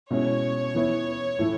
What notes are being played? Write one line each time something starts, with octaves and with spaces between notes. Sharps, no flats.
B2 G#3 C#4 E4 C#5
E3 B3 E4
A2 E3 A3 E4